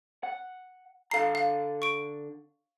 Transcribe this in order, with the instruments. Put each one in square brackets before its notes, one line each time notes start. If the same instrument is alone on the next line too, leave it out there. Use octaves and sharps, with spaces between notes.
[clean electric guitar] F#5
[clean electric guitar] D3 A4 A#5 [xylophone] F5 C7
[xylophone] F5
C#6 D7